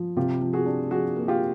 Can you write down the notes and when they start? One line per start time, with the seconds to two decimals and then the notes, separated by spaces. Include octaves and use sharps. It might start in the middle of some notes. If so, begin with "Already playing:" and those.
Already playing: F3
0.16 C3 F4 G4
0.41 F3
0.53 F#4 G#4
0.66 D4
0.91 F3 F#4 G#4
1.16 A#3
1.28 F4 G4